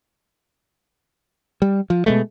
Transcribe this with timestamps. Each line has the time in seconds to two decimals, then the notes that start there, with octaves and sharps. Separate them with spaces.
1.62 G3
1.90 F3
2.06 B2 G#3 A3